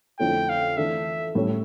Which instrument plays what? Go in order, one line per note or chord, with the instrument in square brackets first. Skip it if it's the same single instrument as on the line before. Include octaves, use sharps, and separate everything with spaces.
[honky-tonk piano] F2 D3 A3 C#4 E4 [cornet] G5
[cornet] F5
[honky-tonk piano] E3 A3 D4 A4 [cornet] E5
[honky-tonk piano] A2 G3 C#4 E4